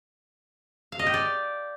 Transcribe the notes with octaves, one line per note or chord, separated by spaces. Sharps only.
F5
D#5
G4
D5